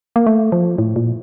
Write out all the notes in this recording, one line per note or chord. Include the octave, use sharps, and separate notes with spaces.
A#3
A3
F3
A2
A#2